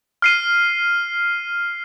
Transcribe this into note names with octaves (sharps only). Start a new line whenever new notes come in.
F6 C7 D#7